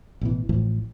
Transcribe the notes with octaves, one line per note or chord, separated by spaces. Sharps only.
A1 B2 E3
A1 A2 E3 F3